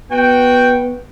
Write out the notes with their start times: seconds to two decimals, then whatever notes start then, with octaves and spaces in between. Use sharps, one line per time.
0.11 B3 F#4 G5